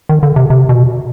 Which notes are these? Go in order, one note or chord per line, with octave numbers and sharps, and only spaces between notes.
D#3
D3
C3
C3
B2